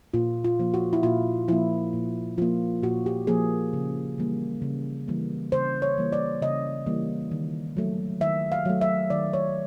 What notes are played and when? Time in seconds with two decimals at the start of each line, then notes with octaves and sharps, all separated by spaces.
0.14 A#2 F4
0.44 F4
0.59 F3 A#3
0.74 F#4
0.93 E4
1.03 A#2 F4
1.48 F3 A#3 E4
1.93 A#2
2.38 F3 A#3 F4
2.83 A#2 F#4
3.06 G4
3.27 F3 A#3 G#4
3.73 C#3
4.18 E3 G3 A#3
4.62 C#3
5.08 E3 G3 A#3
5.52 C#3 C5
5.82 C#5
5.97 E3 G3 A#3
6.13 D5
6.42 C#3 D#5
6.86 E3 G3 A#3
7.31 D#3
7.77 F#3 A3
8.21 D#3 E5
8.52 F5
8.65 F#3 A3
8.81 E5
9.10 D#3 D5
9.33 C#5